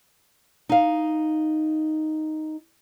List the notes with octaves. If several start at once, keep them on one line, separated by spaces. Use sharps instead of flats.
D#4 F5